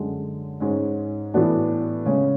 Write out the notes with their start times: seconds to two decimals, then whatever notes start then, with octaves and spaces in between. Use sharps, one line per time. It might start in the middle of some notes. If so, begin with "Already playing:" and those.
Already playing: F#2 D3 G#3
0.60 G#2 G#3 C#4
1.34 A2 E3 B3 D4 F#4
2.05 C#3 G#3 C#4